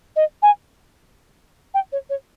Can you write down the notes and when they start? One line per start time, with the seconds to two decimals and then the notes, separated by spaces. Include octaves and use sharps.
0.16 D#5
0.42 G#5
1.74 G5
1.92 C#5
2.10 C#5